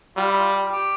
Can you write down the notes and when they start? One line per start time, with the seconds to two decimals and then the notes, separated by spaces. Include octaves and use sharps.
0.16 G3 F4
0.28 E4
0.38 F4
0.72 G4